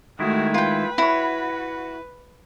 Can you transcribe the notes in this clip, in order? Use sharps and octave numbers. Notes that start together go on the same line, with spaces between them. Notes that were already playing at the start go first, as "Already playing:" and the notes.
D#3 G#3 A3 E4 F#4
F4 B4 G5
E4 F#4 C#5